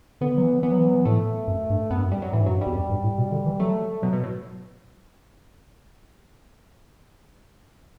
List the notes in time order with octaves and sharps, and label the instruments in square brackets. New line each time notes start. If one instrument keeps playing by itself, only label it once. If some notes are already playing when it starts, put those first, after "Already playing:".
[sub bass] D3 [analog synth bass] B3
[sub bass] F#3
E3
[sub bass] E3 [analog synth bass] B3
[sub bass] F#3
E3
F#3
E3
[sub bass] A2 [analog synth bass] A3
[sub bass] F#2
G2
[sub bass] F#2 [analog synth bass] B3
[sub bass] G2
F#2
[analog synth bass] G3
F#3
[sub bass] A2 [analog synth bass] E3
[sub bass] G2
[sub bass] F#2 [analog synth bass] F#3
[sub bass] G2
[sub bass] E2 [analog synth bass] G3
[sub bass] F#2
G2
A2
B2
D3
E3
[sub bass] F#3 [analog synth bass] A3
[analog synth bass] B2 [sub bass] F#3
[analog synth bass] B2
A2